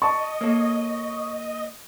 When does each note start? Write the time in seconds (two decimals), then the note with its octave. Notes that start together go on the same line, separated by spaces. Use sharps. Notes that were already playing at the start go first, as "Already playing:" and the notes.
0.02 D5 D#5 A5 C#6
0.41 A#3 A4 C#5